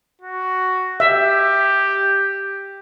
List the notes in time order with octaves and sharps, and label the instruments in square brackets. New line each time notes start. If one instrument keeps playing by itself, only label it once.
[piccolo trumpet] F#4
[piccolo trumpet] G4 [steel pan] E5